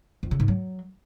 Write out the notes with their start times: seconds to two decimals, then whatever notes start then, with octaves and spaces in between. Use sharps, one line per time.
0.23 F2
0.31 C#3
0.40 G#2
0.48 F#3